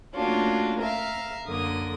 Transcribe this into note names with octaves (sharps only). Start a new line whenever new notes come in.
A3 A#3 C#4 D4 F4 F#4
A#4 E5 F5
F#2 D3 A#3 D#6